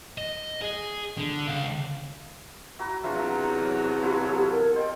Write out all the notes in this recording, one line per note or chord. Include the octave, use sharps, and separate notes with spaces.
D#5
G#4
D3
C#2 F5
E4 F#4 A#5
E2 C3 F#3 D4 F4 E5
E4 F4 G4
A4 C#5 D#6
A#4
C5 D#5 G5